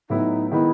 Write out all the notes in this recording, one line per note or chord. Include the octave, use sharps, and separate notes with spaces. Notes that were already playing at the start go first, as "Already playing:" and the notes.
A2 F#3 B3 D#4 E4
D#3 G#3 B3 D#4 E4